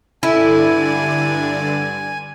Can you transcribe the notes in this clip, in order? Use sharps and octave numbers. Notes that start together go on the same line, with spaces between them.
G2 D3 E4 A4 D5 G#5